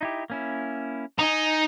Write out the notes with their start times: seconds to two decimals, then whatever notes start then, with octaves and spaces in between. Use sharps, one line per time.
0.01 D#4 E4 G4
0.30 A#3 C#4 E4
1.19 D#4 G#5 A#5